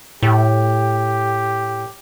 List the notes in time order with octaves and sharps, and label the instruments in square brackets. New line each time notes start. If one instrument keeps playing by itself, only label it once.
[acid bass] A2 [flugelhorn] G4